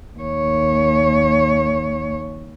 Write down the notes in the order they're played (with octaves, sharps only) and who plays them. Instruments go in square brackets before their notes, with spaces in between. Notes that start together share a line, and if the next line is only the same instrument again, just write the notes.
[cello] D#2 C#5